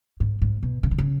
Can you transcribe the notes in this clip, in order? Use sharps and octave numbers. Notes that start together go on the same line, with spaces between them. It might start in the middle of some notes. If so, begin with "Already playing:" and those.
G#2
G#2
B2
C#3
D#3
C#3